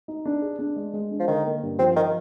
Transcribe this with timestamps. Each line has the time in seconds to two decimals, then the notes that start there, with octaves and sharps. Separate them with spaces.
0.08 D#4
0.26 D4
0.42 G#4
0.59 D4
0.76 G#3
0.93 G#3
1.11 D4
1.20 F3
1.28 D3 D#3
1.45 A#3
1.62 G2
1.79 F3 C4
1.96 D#3 F3